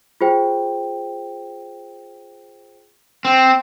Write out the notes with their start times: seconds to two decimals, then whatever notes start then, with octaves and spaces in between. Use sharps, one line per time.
0.21 F4 G#4 C5 G5
3.25 C4